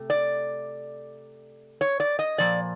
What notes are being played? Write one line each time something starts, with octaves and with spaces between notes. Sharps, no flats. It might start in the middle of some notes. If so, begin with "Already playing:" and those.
Already playing: C3 A3
D5
C#5
D5
D#5
A#2 F3 D5